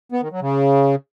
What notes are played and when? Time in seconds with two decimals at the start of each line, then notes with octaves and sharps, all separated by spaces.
0.12 B3
0.22 D#3
0.32 F#3
0.41 C#3